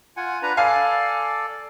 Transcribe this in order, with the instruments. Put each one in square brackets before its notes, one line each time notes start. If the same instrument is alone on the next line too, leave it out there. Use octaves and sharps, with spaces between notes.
[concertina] F4 F#5 G#5
D4 B4 A#5
[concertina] A4 D5 [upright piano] F5 G#5